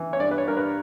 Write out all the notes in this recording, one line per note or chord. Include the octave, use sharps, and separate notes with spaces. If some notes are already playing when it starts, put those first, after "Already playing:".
Already playing: E3
C#5
G2 D5
B4
C#5
G2 A#4
B4